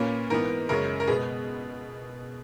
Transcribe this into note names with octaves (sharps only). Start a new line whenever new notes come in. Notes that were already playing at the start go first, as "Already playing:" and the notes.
Already playing: A#2 A#3 C#4 B4
G#2 E3 B3 A#4
F#2 C#3 G#3 C#4 A#4
A#4
B2 G#3 B3 G#4